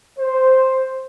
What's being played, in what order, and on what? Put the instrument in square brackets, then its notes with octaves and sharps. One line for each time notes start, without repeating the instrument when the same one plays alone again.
[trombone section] C5